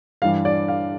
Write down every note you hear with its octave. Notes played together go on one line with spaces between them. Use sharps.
G2 E3 G3 F5
D5
F5